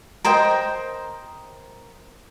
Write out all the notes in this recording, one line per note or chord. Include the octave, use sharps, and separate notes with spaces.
A#4 C5 D#5 G5